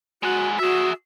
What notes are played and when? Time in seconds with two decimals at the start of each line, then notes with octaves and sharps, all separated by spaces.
0.23 G#3 F#4 F#5
0.59 F#4 G#4 E5